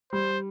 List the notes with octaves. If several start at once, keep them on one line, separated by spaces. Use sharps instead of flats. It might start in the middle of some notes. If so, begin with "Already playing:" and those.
G3 C5